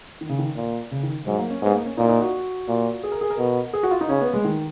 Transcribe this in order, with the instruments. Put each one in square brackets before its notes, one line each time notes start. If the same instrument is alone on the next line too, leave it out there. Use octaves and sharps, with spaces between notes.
[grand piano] D#3
C#3
D#3
[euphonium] A#2
[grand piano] C#3
D#3
[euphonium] G#2 [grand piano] F#3
[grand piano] A#3
C#4
[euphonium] G#2 [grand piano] B3
[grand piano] A#3
C#4
[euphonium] A#2 [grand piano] D#4
[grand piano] D#4
F#4
[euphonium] A#2
[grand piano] G#4
A#4
G#4
A#4
[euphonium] B2
[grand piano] G#4
F#4
F4
D#4
[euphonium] C#3 [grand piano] C#4
[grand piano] B3
G#3
D#3